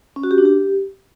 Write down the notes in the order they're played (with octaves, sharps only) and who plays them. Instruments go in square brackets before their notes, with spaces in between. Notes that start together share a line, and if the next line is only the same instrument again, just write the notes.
[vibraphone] C#4
F#4
G4
D4
G4